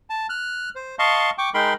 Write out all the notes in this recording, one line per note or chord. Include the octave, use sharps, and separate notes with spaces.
A5
F6 F#6
C5
D#5 F5 A5 C6 C#6
G5 C#6 D6
G#3 D#4 A#4 G5 B5 C6